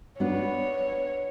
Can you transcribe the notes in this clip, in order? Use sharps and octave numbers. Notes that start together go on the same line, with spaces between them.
B3 D4 B4 C#5